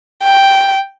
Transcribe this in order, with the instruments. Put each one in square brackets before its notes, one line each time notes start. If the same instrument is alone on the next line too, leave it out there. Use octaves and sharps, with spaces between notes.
[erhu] G5